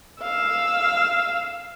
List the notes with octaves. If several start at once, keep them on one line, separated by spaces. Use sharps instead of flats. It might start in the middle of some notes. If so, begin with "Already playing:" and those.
F5 E6